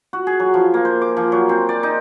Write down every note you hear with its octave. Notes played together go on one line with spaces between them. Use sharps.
F#4
G#4
F#3
F3
A#3
C5
D6
F3
F#3
C4
D5
D#4